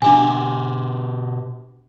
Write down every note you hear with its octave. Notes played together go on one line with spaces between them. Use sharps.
B2 D4 G4 G#5